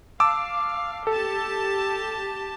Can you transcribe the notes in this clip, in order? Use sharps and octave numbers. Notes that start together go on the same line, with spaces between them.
F5 A5 D6 E6
G4 A4 A5